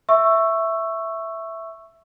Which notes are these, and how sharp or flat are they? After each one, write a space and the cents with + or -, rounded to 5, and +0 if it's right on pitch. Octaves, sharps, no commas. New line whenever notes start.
E5 +0 C#6 -5 E6 +10